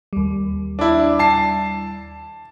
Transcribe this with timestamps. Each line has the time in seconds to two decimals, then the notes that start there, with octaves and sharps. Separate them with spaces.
0.13 D#2 G3
0.79 D4 E4
1.19 A5 C7